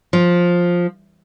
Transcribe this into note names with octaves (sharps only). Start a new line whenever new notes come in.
F3